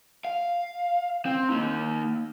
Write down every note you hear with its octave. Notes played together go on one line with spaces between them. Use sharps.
F5
C4
A#3 D#4